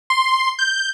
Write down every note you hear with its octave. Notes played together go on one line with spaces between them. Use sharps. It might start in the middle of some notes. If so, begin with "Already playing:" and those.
C6
G6